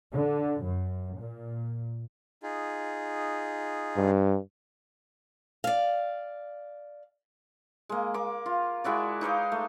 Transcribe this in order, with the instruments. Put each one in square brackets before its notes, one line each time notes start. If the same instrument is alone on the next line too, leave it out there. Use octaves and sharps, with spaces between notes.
[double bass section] D3
F#2
A#2
[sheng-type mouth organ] D#4 F4 G#4
[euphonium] G2
[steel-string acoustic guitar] D5 F5
[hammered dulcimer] G#3 A#3
A#3 D6
F4
G#3 E4 F#4 D5
D#4 B4 F5 D6
A3